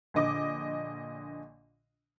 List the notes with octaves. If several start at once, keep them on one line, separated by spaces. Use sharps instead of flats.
A#1 D3 D#5 D6